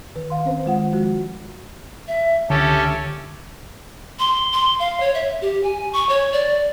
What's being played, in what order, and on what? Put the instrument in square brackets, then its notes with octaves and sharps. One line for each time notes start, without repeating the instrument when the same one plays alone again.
[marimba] D#3 B4
F5 C6
C4 C#4 C5
D#3 G#3 F4 F#5
F3 G#3 F#4
[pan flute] E5
[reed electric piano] C#2 D3 A5 [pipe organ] C#4 G4 A4 [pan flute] E5
[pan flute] C6
C6
F5
C#5
E5
G4
G#5
C#6
C#5
D5